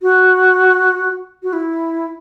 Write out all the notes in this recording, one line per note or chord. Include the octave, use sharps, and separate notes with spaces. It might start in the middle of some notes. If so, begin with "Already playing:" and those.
F#4
F#4
E4